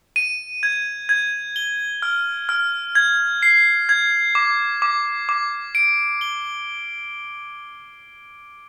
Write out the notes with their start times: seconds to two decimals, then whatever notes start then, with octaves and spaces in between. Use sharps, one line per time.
0.16 D#7
0.63 G#6
1.09 G#6
1.56 G7
2.02 F6
2.49 F6
2.95 G#6
3.43 C7
3.89 G#6
4.35 D6
4.82 D6
5.29 D6
5.75 D7
6.21 G7